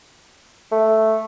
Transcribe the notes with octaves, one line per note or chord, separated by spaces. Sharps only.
A3